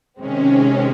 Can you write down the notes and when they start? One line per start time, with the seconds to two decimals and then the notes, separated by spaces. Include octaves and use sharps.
0.20 C3 D#3 G#3 C4 C#4